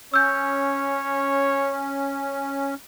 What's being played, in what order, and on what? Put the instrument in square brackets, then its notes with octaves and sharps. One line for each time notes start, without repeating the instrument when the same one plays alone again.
[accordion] C#4 [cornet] C#5 [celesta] E6 G6